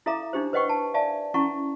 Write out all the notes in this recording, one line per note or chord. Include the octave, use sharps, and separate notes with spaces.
E4 A4 E5 F5 A#5 D6
D4 D#4 G4 C5
B4 C5 D#5 F#5 G5 C#6
A5
D5 E5 F5 G#5 A5
C#4 E4 F#5 A5 A#5 C#6